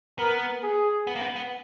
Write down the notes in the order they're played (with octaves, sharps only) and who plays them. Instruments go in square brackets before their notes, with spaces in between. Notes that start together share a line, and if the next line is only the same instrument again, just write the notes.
[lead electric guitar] B3 [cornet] A#4
[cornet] G#4
[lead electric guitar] B3
A#3
B3
B3